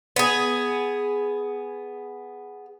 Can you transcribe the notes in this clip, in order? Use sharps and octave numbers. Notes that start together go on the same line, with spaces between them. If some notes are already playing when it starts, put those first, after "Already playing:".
B3 G#4